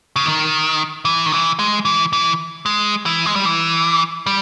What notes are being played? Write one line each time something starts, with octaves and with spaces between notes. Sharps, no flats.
C#3
D#3
E3
D#3
E3
G#3
E3
E3
G#3
E3
G#3
G3
E3
G3